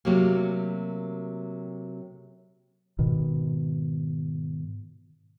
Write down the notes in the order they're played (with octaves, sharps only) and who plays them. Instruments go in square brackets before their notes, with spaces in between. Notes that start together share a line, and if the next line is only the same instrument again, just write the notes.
[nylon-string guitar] C3 F#3 A3 A#3
[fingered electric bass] G#2 B2 D#3